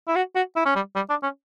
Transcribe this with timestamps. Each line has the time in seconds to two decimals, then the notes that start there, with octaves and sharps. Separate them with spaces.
0.08 E4
0.16 F#4
0.35 F#4
0.56 E4
0.66 C#4
0.76 G3
0.96 G3
1.10 D4
1.23 C#4